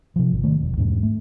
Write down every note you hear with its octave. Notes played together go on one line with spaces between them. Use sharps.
C3 F3
G#1
D#3 A3
E1
E2 G#2
A3